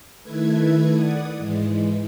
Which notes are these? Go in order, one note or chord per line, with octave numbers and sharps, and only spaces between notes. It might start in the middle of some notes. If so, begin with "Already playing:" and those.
D#3 A3 E4 A4 B4 G#6
D5 F#5 D#6
G#2 E3 G#3